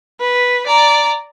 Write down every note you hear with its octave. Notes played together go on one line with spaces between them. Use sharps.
B4
D5 A#5